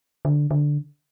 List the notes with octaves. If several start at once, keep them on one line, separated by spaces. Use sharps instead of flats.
D3
D3